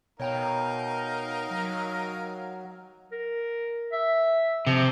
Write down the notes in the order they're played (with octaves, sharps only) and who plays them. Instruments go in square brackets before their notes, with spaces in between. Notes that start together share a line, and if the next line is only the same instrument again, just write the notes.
[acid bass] B2 [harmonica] D#4 A#4 F5 [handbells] C#5 G5 A#5
[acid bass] F#3
[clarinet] A#4
E5
[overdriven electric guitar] C3 [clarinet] F3